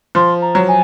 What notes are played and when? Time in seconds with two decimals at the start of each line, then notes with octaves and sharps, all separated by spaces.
0.15 F3 C6
0.42 A#5
0.55 F#3
0.69 G#5